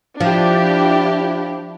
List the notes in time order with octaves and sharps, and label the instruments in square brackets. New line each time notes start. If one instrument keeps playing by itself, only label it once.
[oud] F3 [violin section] D4 E4 G4